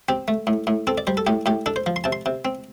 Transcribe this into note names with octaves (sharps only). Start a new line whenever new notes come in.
C4 G4
A3
A2
A2
C4 A4
D5
G3 C5
A4
A2 G4
A2 G4
D4 A4
C5
F3
C6
C3 A5
C6
C3
C4